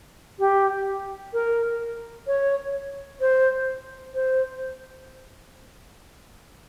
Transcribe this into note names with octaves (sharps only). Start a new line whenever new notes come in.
G4
A#4
C#5
C5
C5